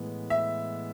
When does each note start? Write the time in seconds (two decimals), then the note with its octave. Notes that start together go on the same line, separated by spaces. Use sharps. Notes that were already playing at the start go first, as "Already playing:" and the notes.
Already playing: A2 E3 G#3 B3
0.30 E5